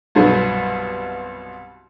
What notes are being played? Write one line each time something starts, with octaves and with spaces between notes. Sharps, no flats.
C2 G2 B2 F#3 B3